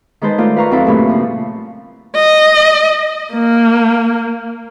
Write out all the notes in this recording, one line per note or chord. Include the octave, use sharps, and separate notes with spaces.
D#3 G#3 B4 C5 A5
A3 F4 A#4 D5
B4 F5 A#5 C#6
F2 F#3 C4 E4 A4 B4
G2 A#2 C#3 A3 C#5 B5
F3
D#5
A#3